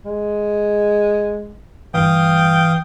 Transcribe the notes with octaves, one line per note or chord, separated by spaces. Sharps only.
G#3
G1 G2 E3 F5 G5 D#6